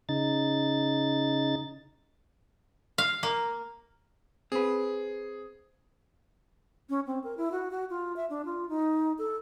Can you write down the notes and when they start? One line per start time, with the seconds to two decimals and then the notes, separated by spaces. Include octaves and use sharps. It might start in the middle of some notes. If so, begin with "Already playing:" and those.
0.09 C#3 D#4 A6
2.98 F5
3.23 A#3
4.52 C4 G#4 B4
6.89 C#4
7.07 C4
7.24 A#4
7.37 E4
7.52 F#4
7.71 F#4
7.90 F4
8.16 E5
8.30 D4
8.45 F4
8.69 D#4
9.18 A4